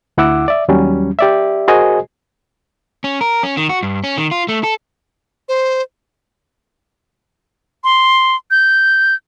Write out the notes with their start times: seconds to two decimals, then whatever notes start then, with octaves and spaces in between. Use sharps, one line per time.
0.17 D2 E4 F#5 D6 E6
0.48 D5 E5
0.68 D#2 F#3 G3 C#4
1.19 G4 D5 E5
1.68 F#4 G#4 A#4 C5 D#5 G#5
3.04 C#4
3.21 A#4
3.43 C#4
3.57 D#3
3.69 F#4
3.83 G2
4.04 C#4
4.18 D#3
4.31 F4
4.49 A3
4.63 A4
5.49 C5
7.84 C6
8.51 G6